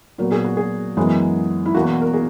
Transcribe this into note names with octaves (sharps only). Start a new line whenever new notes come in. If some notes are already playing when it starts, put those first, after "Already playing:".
A#2 F#3 B3 A#4
G#4
F#4
G#4
F#2 E3 G#3 B3
E4
E2 B2 A#3 F#4
A#4
G#4